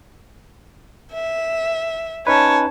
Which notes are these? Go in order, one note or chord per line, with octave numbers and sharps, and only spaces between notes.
E5
C#4 D#4 B4 C#5 A5